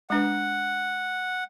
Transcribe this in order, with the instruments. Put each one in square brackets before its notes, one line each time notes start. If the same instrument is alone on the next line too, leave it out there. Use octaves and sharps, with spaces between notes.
[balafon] G#3 D4 B4 [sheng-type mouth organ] F#5